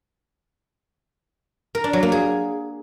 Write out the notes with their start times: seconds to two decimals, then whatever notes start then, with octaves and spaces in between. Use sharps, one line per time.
1.75 A#4
1.84 D4
1.93 F#3
2.03 A#3
2.12 G#4